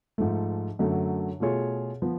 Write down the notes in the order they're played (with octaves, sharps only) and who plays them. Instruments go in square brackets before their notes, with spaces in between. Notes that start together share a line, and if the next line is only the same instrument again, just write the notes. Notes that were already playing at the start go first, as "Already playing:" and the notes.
[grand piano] G#2 F3 A3
F#2 D3 F#3 A3
B2 A3 F4 G#4 C#5
F3 B3